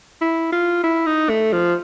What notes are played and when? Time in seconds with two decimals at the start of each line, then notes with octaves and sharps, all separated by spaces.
0.22 E4
0.52 F4
0.83 E4
1.06 D#4
1.29 A3
1.53 F3